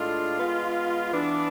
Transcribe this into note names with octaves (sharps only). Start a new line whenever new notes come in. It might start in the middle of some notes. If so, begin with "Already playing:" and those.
Already playing: A2 G#3 D4 F4 A4
G#3 B3 F4
E3 B3 D4